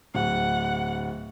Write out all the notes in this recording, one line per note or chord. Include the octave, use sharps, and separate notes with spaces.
D1 F#5